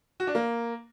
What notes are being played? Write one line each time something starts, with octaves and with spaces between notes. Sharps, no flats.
F#4
D4
A#3